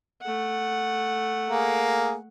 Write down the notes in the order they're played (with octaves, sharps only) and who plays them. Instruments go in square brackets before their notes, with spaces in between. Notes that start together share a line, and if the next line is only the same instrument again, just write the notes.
[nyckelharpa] A3 F#5
[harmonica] A#3 G#4